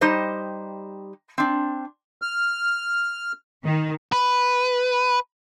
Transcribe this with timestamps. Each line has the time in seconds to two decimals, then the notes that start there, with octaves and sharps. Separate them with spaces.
0.01 G3 D#4 G4 C5 D#5
1.38 C4 D4
2.22 F6
3.65 D#3
4.12 B4